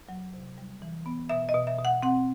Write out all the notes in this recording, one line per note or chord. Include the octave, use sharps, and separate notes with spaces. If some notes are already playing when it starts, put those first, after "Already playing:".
Already playing: E2
F#3
C3
G3
E3
B3
B2 E5
D#5
B2
E5
B2
F#5
C4 F#5